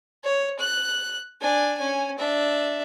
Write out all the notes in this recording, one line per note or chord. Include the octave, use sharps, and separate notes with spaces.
C#5
F#6
D4 G#5
C#4 G#5
D4 E5